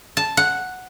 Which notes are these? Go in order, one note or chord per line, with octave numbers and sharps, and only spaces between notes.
A5
F#5